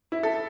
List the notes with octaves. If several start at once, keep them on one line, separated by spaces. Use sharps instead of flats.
E4
A4